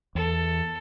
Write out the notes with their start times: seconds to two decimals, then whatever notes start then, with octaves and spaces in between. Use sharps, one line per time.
0.15 E2 A4